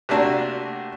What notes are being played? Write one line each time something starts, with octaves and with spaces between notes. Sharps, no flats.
C3 A3 A#3 D4 F#4